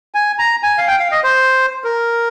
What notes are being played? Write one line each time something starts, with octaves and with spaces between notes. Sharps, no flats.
G#5
A#5
G#5
F5
G5
F5
D#5
C5
A#4